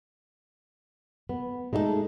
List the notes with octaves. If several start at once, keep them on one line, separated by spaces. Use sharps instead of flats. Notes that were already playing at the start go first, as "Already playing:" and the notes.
B3
G#3 A3 D#4 F#4 A4